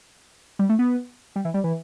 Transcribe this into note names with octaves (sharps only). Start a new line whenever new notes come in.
G3
A3
B3
G3
E3
G3
E3